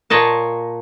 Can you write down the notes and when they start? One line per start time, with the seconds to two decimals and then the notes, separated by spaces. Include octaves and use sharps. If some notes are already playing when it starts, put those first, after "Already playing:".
0.10 A#2 C#5 D#5 A5